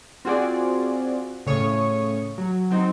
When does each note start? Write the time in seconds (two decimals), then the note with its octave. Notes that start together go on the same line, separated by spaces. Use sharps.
0.25 C4 F4 F#4 G#4 C5 D5
1.46 A2 C#3 C#5 C#6 D#6
2.38 F#3
2.70 F#3 C4 D#4